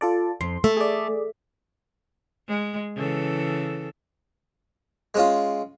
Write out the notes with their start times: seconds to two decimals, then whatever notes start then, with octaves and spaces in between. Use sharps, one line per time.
0.01 F4 A4 D5
0.41 F2 C6
0.64 A3 E5
0.77 G#4 D5
2.48 G#3
2.96 C#3 E3 A4
5.14 G#3 C#4 F4